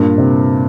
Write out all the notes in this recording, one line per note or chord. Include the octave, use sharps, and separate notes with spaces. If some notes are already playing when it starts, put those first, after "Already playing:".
Already playing: G2 A#2
C3